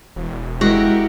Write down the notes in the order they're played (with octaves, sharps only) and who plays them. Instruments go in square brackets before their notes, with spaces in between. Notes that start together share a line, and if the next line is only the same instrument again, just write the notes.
[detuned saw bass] E1
[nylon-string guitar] G#3 [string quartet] E4 G4 A#4 [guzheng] F#4